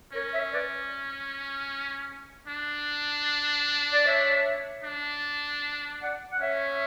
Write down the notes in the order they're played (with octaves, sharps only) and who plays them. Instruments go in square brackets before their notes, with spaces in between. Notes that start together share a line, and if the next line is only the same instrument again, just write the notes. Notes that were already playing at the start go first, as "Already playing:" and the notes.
[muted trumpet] C#4 [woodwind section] A#4 C#5
[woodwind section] C#5 E5
B4 D5
[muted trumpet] D4
[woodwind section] D5
C#5 E5
[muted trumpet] D4
[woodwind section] D5 F#5
F#5
[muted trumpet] C#4 [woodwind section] C#5 E5